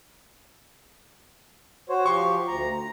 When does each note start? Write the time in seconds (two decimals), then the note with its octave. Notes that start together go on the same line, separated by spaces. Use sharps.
1.89 F#4 C5 C#5
2.06 F3 G4 C6 C#6
2.48 D2 A#5
2.72 A#5